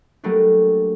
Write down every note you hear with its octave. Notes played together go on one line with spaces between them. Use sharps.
F#3 G3 A3 A#3 D4